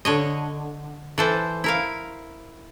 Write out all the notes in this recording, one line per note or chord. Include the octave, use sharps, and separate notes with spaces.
D3 C#5 D#5
E3 A4 C5
E4 A#4 F5